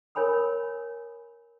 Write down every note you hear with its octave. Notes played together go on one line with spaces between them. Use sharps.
A#4 C#5 G#5 B5 D#6